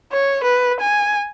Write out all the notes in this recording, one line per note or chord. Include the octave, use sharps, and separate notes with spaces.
C#5
B4
G#5